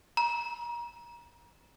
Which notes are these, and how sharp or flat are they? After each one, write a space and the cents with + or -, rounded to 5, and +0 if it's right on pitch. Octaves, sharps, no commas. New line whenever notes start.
A#5 +30